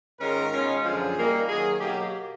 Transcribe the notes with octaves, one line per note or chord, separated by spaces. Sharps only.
G#2 D#3 G#3 C#4 F4 A#4
B2 G#3 C#4 F4
F#2 D3 F3 G#4
A#2 G3 A#3 D#4
D#3 F#3 A#3 G#4
B2 F#3 A#3 G4